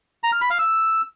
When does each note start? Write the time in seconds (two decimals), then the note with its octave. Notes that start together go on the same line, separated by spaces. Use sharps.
0.23 A#5
0.32 F6
0.41 B5
0.50 F5
0.59 E6